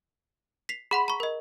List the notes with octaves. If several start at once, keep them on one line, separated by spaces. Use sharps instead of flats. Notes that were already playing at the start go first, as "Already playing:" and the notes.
B6 C7 F7
G#4 F#5 B5 C6
A#5 C#6
A#4 D#5